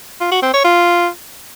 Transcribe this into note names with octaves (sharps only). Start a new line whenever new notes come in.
F4
F#4
C4
C#5
F4